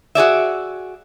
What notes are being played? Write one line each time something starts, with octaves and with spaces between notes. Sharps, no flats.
F#4 G#4 D5 E5